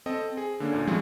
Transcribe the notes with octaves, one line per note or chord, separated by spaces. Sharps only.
C4 A4 D#5
G#4
D3 A#3 C#4 D4
D2 A#2
D2 A2 F3 G3 G#3 C4